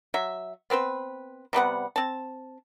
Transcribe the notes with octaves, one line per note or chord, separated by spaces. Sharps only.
F#3 E5
B3 C4 B4 C5
C3 G3 B3 F#5
C4 A5